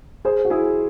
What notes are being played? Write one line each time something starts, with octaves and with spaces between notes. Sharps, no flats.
G#4 C5
F#4
E4 G#4